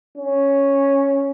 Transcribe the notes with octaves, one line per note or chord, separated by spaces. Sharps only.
C#4